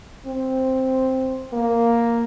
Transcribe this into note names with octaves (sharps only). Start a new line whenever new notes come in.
C4
A#3